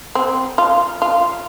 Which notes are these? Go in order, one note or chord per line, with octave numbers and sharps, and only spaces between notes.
C4
F4
F4